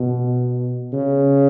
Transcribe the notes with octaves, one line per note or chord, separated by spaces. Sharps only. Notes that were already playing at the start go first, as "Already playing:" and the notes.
Already playing: B2
C#3